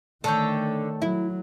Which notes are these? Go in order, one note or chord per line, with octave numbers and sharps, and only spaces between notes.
D3 D#3 A3 A4 C#5 G5
F#3 E4